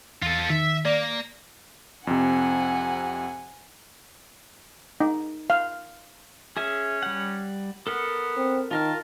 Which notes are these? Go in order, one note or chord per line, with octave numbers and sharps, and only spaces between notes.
E2 F4 A4
D#3 E5
A#3 D5
F2 C3 F#5 G#5
D#4
F5
C#4 G#4 E5 G#5
G3 F#5
B3 A4 A#4 F#5
C4
D#3 F4 A#4 A5 F6